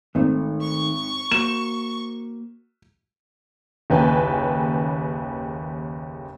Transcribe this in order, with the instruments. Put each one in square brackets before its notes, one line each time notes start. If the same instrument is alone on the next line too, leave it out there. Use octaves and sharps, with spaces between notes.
[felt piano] G#1 [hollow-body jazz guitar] D#3 A3
[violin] C#6
[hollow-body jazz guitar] A#3 F#4 C5 [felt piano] E7
[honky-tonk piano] F#1 D#2 C#3 B4 G5 G#5